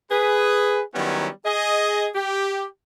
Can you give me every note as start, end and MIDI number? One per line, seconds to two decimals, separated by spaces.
0.11 0.82 68
0.11 0.82 71
0.95 1.28 51
0.95 1.28 54
0.95 1.28 55
0.95 1.28 59
0.95 1.28 61
0.95 1.28 64
1.46 2.08 68
1.46 2.08 75
2.15 2.65 67